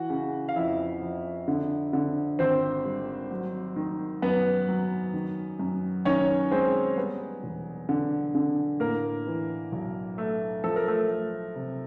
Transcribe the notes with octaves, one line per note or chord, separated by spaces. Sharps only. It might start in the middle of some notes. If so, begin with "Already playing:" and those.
Already playing: E3 F#4 F#5
C#3
F5
F2 E4 E5
F2
D3
D3
G#1 C4 C5
G3
F#3
D#3
F#2 B3 B4
F#3
D#3
F#2
D#3 C#4 C#5
G#3 C4 C5
G3 B3 B4
E1
D3
D3
A2 A#3 A#4
E3
B1
A3
F3 A4
A#4
A3 A4
A3
C3